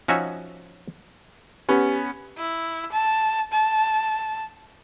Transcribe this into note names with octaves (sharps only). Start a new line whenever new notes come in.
F3 C#4 D#4 F#4 E5 G#5
B3 C#4 G4
E4
A5
A5